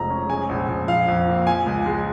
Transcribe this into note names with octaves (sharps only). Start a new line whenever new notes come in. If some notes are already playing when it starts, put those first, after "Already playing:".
Already playing: F1 F3 G#3 A#5
C#4
G#3 G#5
A#1
A#1
F3 F5
F2
A#3
F3 G#5
C#2
G#3